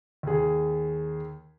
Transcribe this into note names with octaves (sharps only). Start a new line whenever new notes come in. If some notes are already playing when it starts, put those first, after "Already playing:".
D#2 G#4